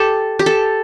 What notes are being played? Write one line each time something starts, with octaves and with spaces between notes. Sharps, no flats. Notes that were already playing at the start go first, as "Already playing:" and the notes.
Already playing: G4 A4
G4
A4